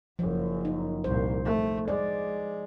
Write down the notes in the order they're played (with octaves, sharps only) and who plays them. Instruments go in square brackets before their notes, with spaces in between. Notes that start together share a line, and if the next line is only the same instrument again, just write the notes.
[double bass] F#1 F#2 [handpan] F3
[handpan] D#4
[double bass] C2 A#2 [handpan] C5
[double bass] A3
[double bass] G#3 [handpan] D5